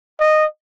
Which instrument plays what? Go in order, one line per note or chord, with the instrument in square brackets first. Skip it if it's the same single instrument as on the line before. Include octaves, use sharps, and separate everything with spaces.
[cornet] D#5